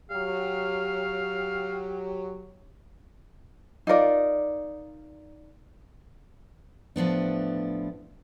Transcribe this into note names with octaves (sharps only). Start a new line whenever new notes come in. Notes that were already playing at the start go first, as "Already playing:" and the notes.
F#3 G4 F5
D#4 F4 A#4 D5
A2 F3 B3 D4